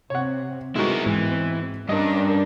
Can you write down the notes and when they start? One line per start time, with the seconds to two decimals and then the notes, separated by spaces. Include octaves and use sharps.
0.10 C3 C#5 F#5
0.76 G#3 B3 C4 D#4 E4 F#4 A#4
1.06 G#2 E3
1.89 G2 C#4 D4 A#4 D#5